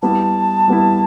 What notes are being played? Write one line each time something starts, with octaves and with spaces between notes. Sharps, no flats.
G3 B3 E4 A5
G3 B3 E4